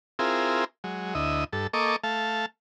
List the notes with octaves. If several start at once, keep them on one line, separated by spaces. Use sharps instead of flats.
C4 E4 F4 G#4 A#4
F#3 G#3
D2 E4 D#5
G2 A4
A#3 A4 D#5 C#6 D6
A3 F5 A5